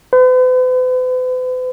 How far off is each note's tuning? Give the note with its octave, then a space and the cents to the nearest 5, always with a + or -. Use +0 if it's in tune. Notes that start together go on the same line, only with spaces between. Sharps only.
B4 +45